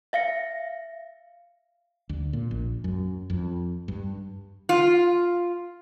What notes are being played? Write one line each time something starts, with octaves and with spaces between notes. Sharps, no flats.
E5 F5 A#6 C#7
D2
A#2
A#1
F#2
F2
G2
F4